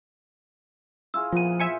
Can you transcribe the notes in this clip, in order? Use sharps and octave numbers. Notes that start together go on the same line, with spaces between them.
E4 F4 G#4 E6
A#2 F3 A#3 B3 F4 D#7
C5 E5 G#5 C#7